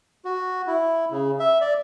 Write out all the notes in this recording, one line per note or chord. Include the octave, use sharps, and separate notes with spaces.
F#4
E4
C#3
E5
D5